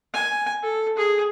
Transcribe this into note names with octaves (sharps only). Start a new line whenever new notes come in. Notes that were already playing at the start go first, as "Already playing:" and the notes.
G#5
A4
G#4